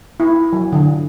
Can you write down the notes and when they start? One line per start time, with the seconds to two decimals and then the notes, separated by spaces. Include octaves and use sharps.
0.20 E4
0.53 F#3
0.73 D3